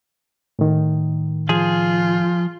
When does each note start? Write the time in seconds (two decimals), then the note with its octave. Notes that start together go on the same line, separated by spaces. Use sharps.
0.59 A2 D#3
1.49 F3 F4 G#4